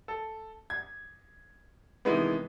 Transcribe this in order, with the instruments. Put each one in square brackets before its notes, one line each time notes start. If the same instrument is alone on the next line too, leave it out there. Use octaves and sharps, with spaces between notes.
[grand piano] A4
G#6
C3 D#3 E3 G#3 B3